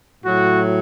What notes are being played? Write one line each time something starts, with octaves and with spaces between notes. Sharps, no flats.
A2 F#3 F#4